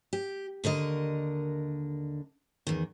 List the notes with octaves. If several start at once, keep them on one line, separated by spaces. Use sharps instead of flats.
G4
D#2 D3 A#4 D#5
E2 D#3